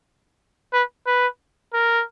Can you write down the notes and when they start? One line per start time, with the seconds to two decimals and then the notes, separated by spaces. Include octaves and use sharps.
0.73 B4
1.07 B4
1.73 A#4